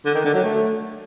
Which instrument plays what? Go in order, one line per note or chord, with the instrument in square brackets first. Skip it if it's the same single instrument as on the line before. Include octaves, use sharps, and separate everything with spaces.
[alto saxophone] D3
D#3
D3
F#3
A3